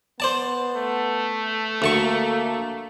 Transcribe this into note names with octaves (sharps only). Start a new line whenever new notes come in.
B3 C5 D5 A5
A3
D2 A#3 A5 C#6